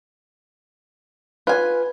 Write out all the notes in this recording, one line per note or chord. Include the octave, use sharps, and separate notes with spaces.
F4 B4 G#5